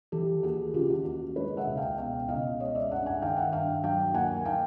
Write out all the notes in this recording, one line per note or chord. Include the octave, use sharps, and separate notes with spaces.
E3 G4 A4
D#2 F#4 G#4
C#3 F4 G4
F#4
D#2 F#4
G#3 B4 C#5
E5 F#5
C#2
F5 G5
B2 F5 G5
C#2 D#5 F5
G#3 C#5 D#5
D5 E5
G2 E5 F#5
F#5 G#5
D#3 F5 G5
E5 F#5
G2 F5 G5
F#3 F5 G5
D#2 F#5 G#5
D#3 F5 G5